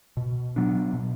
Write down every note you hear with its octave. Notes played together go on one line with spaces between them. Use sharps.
B2
F#3 B3 D4
B2